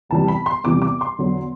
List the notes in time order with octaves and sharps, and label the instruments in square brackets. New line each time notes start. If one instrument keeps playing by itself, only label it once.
[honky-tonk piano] E2 C3 E3 G3 A5
B5
C6
E2 C3 E3 G3 D6
D6
C6
E2 D3 F#3